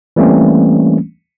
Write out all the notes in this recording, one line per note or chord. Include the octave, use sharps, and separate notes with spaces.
E3 G3 A3 A#3 C4 C#4